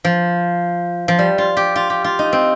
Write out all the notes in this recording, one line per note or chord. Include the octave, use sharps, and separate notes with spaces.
F3
F3
G3
F4
G4
F4
G4
F4
D#4
C4